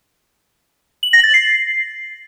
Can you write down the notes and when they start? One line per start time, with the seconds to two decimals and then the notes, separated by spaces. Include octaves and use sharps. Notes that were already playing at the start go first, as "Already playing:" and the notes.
1.03 F#7
1.13 A#6
1.24 A6
1.34 C7